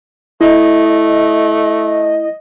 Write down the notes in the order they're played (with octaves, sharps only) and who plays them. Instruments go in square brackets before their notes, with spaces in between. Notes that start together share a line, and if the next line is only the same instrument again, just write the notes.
[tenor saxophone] A3 [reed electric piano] E4 [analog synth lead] D#5